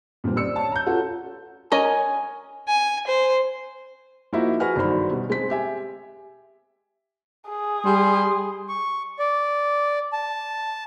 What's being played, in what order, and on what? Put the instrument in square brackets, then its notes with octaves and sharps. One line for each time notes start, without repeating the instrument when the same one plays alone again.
[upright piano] A#2 D3 G3 C4
A1 C5 D5 E6 C#7
C#5 A5
A#5 G6
C#4 F4 F#4 A4
[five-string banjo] C#4 A#4 D#5 [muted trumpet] G#5
[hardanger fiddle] G#5
C5
[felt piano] F3 A#3 D#4 E4 F#4 E5
F#4 G#4 B4 F#5 G#5 F6
G1 D3 D#3 F#3 C5 B5
B2 G3
G#3 C4 B6
G4 E5 G#5
[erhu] G#4
[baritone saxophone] G3 [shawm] C6
[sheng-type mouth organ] C#6
D5
A5